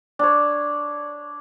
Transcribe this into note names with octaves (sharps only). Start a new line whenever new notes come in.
D4 C#5